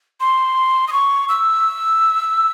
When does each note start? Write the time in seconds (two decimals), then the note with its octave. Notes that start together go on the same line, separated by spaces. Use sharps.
0.20 C6
0.88 D#6
0.92 C#6
1.29 E6